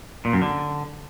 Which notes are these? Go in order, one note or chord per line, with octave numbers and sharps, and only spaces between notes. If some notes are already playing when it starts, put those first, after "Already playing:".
A#2
F#2
D3